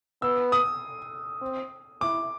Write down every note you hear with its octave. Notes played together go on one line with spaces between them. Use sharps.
B3 E6
D#6
C4
E4 D6